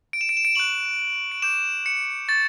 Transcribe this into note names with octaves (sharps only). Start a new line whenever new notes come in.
D7
E7
D7
E7
D7
C#6 F#6 F#7
D7
D6 G6 E7
C#7
C#6 G6 A6